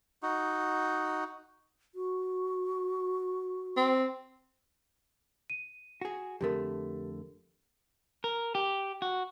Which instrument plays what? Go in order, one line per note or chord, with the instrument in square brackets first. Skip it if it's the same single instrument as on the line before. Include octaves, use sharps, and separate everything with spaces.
[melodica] D#4 F#4
[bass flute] F#4
[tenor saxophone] C4
[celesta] D#7
[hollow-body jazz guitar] F#4 G#4
[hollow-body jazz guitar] F2 D3 A3 [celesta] G4 A#4
[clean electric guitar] A#4
G4
F#4